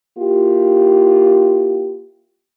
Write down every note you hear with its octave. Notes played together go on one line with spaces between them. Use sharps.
A#3 E4 F4 G4